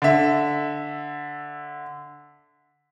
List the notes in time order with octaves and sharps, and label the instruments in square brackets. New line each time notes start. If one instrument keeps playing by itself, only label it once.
[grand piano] D3 E5